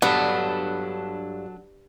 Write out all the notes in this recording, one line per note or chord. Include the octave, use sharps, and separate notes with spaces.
G2 F#3 B3 D4 A4